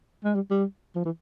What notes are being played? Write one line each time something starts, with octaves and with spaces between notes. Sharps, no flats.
G#3
G3
G3
F3
E3